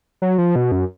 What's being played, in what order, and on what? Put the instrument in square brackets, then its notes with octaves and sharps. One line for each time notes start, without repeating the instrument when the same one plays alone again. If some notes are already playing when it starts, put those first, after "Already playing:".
[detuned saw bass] F#3
F3
B2
F#2